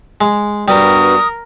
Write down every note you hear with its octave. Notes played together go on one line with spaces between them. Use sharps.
G#3
G2 G3 B3 F#4 A#4 D#6